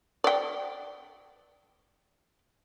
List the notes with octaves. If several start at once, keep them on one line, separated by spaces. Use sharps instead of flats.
D5 G5